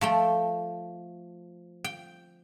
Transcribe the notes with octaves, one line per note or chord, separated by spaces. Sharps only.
F3 A3 G5
G5